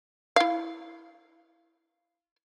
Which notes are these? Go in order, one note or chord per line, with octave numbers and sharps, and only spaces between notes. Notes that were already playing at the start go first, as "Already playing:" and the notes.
E4 F5